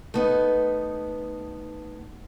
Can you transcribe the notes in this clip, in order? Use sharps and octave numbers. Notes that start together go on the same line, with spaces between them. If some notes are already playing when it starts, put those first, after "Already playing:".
A3 B3 D#4